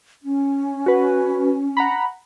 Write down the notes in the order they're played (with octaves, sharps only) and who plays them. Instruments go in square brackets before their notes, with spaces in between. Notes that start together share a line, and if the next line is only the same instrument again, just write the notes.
[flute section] C#4
[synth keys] F#4 B4
F#5 A#5 B5